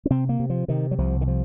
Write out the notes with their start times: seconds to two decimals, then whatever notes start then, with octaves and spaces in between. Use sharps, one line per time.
0.05 C#4
0.10 C3 C4
0.29 A#3
0.39 C3
0.50 F3
0.68 C3 D#3
0.91 F#3
0.98 C2 F3
1.21 D#3
1.27 C3 F3